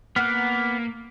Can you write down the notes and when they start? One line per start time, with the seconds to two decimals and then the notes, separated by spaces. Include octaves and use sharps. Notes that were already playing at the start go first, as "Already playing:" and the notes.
0.16 A#3 B3 F#5 F6 F#6